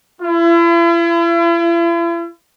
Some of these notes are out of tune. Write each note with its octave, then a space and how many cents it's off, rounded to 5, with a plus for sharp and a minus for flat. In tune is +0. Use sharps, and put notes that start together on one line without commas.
E4 +45